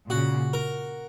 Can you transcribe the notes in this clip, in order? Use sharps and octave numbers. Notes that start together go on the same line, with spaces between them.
A#2 C#3 F#4
A#4